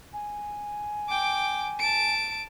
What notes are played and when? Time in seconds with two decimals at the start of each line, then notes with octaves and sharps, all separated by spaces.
0.13 G#5
1.09 G5 D6
1.80 A5 D7